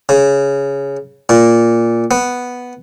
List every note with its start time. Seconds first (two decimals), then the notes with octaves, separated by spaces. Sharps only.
0.09 C#3
1.29 A#2
2.11 B3